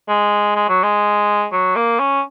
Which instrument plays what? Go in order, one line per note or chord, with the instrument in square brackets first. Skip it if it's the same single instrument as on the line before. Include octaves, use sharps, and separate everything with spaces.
[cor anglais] G#3
G#3
F#3
G#3
F#3
A#3
C#4